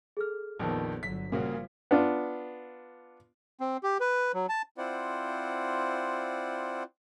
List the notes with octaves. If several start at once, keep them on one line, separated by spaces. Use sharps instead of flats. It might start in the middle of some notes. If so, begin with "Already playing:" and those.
G#4 A4 F6
A#1 F2 D#3 F3 B3
G1 D3 F#3 B6
A#2 C#3 F3 G3 A#3 F#4
B3 D4 F4
C4
G4
B4
F#3
A5
C4 E4 F4 C5 D5 F#5